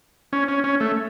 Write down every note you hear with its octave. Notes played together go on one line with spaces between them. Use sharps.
C#4
C#4
C#4
A3